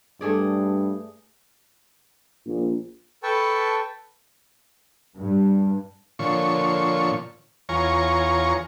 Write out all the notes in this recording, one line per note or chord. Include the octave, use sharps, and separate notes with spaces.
G2 A3 G#4 D5
A#1
A4 B4 G5 A5 C#6
G2
A#2 D3 F3 C#5 C#6
E2 F4 C#5 G#5 A#5 C#6